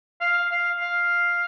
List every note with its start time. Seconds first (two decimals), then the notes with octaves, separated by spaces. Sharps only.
0.21 F5
0.51 F5
0.81 F5